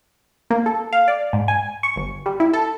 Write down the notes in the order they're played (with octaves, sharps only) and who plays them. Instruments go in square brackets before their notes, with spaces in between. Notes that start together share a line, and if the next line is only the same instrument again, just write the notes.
[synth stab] A#3
A4
F5
D5
G#2
G#5
C#6
G1
G3
E4
A4